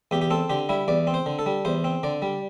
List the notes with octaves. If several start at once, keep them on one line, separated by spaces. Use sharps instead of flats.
E2 G4
G4
C4 A4
D3 G4
G3 E4
E2 D5
C4
C5
D3
A4
G3
E2 C5
C4
D3 D5
G3